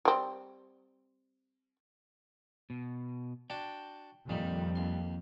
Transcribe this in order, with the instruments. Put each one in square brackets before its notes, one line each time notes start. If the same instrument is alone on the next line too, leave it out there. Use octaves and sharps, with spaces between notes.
[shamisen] G3 C4
[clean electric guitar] B2
[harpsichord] D4 F#4 A5 [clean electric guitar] G5
[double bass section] F2 [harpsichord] A#2 D#3 [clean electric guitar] G3
[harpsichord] D#2 C6